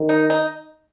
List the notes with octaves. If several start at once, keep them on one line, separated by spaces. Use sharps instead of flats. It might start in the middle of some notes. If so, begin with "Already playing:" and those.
Already playing: D#3
D#4
D#4